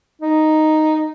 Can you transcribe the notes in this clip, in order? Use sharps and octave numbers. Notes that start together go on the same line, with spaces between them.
D#4